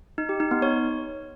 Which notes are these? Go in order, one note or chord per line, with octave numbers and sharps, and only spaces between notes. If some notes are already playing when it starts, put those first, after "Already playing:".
D#4
G4
D#4
B3
C#5